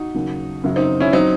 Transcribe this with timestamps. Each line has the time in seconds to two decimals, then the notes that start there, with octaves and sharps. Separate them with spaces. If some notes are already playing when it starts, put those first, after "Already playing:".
Already playing: D#4 F#4
0.14 D#2 C#3 F#3
0.64 F#2 C#3 F#3
0.76 C4 D#4
1.00 C#4 E4
1.13 F#3 C4 D#4